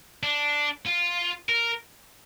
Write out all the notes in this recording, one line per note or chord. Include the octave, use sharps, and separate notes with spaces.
D4
F4
A#4